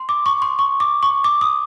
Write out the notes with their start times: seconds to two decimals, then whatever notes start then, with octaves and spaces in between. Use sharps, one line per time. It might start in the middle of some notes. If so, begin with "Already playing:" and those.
Already playing: C6
0.09 D6
0.26 C#6
0.42 C6
0.59 C#6
0.80 D6
1.03 C#6
1.24 D6
1.41 D#6